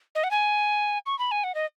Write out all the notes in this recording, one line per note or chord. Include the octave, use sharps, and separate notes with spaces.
D#5
F#5
G#5
C#6
B5
G#5
F#5
D#5